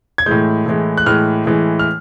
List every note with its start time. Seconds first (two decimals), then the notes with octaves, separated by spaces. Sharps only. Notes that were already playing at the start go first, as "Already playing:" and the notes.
0.18 G#6
0.26 A2 E3 G#3 G6
0.66 A2 E3 G#3
0.98 F#6
1.06 A2 E3 G#3 F6
1.46 A2 E3 G#3
1.79 F6